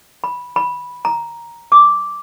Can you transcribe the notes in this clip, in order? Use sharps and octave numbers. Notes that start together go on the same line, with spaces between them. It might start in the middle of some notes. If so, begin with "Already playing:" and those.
B5
B5
A#5
D6